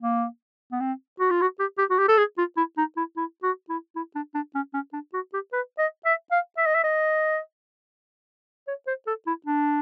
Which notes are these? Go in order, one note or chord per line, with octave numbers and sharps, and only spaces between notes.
A#3
B3
C4
F#4
F4
F#4
G4
G4
F#4
G4
A4
G#4
F4
E4
D#4
E4
E4
F#4
E4
E4
D4
D4
C#4
C#4
D4
F#4
G4
B4
D#5
E5
F5
E5
D#5
E5
D#5
C#5
C5
A4
E4
D4